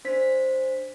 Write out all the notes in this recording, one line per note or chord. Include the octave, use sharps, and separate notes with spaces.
D4 C5 B6